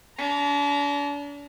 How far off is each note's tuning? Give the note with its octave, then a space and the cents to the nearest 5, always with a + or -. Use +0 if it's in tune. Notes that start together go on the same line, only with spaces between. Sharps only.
D4 -40 A#5 +0